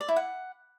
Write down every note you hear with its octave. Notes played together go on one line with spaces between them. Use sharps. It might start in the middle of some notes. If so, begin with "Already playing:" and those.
D5
E4
F#5